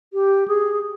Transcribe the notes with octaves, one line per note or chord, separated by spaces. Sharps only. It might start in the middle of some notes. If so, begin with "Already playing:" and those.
G4
G#4